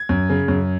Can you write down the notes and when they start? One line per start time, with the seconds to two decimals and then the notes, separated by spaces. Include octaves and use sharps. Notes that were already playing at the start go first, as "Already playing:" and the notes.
Already playing: G#6
0.09 F#2
0.30 C#3
0.48 F#2